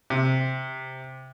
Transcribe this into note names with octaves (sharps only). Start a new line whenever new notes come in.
C3